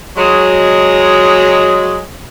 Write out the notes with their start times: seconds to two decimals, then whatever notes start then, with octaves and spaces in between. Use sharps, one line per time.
0.16 F#3 G#3